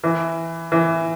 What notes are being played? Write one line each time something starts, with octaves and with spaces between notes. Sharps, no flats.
E3
E3